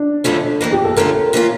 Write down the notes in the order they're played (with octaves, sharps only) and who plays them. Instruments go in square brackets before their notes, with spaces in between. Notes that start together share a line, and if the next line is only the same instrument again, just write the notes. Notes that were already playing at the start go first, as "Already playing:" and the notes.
Already playing: [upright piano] D4
[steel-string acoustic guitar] F2 D3 A3 C#4 F4
F2 E3 A#3
[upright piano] G4
A4
[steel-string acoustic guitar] D3 A3 C#4 F4 [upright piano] A#4
[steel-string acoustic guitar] E3 A#3 C#4 F4